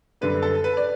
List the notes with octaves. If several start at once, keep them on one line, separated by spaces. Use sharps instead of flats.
F#2 D3 G3 B4
A4
B4
D5